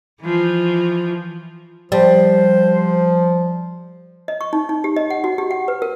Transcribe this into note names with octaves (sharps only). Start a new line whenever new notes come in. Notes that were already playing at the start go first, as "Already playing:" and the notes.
E3 F3
F3 G3 C5
D#5
C#6
D#4
D#4
G4
D#5
F#5
F#4
G4
F#5
B4
A#4